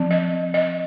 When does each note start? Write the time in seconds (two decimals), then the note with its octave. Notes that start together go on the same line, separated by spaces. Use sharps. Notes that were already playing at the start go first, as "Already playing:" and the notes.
Already playing: F3 C4
0.11 D#5
0.54 D#5